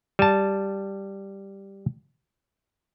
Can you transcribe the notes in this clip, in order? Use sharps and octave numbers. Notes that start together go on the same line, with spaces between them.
G3 A5